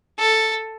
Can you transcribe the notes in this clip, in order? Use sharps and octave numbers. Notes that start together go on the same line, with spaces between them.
A4